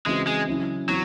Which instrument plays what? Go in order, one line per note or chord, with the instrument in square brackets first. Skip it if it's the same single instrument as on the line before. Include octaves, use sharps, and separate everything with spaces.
[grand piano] C#3 E3 C4 F#4 [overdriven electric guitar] G#3
[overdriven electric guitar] G#3
[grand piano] C#3 F#3 C#4 E4
[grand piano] E3 C4 E4 [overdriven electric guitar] F#3